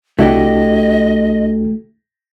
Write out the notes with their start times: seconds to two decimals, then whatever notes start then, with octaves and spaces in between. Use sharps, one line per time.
0.19 C2 A3 D4 E4 F#4 G4 D#5